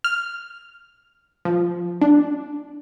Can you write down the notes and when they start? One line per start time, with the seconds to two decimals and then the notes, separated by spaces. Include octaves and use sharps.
0.04 F6
1.45 F3
2.01 D4